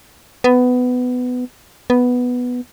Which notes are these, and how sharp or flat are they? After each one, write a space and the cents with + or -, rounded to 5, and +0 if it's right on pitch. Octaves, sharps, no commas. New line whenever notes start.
B3 +15
B3 +0